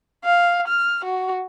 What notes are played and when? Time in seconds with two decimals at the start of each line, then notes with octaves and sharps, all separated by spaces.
0.25 F5
0.68 F6
1.05 F#4